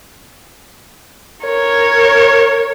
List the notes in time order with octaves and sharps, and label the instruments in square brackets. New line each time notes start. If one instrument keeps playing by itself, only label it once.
[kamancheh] A#4 C#5